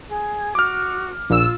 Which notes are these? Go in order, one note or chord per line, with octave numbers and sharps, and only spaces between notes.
G#4
F#4 D6 F6
A#1 F4 E6